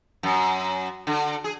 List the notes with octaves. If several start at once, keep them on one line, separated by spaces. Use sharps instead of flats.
F#2
D3
G#4